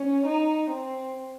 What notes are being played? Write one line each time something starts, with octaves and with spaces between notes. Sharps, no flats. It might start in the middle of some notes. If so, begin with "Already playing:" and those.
Already playing: C#4
D#4
C4